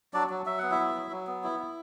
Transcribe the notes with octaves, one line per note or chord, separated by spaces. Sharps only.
F#3 D4 D5
F#3
F#3 E5
B3 F#5
E4 E5
F#3
F#3
F#3
B3
E4
E4